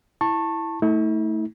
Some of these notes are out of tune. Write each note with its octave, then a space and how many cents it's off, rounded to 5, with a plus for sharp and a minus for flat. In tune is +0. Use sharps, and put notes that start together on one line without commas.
E4 +0 A5 +15 C#6 -20
A3 +10 E4 -45